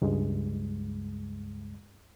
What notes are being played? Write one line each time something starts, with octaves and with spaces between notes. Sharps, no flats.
C#2 G2 G#3